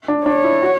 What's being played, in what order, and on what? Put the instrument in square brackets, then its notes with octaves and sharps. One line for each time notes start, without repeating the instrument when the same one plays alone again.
[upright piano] D4
[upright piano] D4 [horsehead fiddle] C#5
[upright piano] E4
F#4